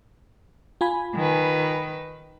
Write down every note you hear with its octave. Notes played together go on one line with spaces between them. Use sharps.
F4 G#5 B5
D#3 B4